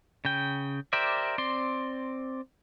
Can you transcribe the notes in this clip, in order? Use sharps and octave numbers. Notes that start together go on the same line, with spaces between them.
C#3 G5
G4 A#4 C5 D5 E5
C4 D5 C6